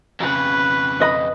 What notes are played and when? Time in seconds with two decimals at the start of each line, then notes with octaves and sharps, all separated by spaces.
0.20 F2 C#3 B4
1.00 B4 D#5 B5